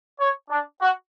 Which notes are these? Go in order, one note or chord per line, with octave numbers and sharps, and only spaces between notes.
C#5
D4
F#4